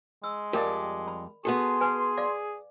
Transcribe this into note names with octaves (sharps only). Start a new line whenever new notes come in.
G#3 E6
F2 G3 G4 A#4 D5 D#5
B5
B3 F#4 G#4 A4 C6
B4 G#5
D5 F5 D6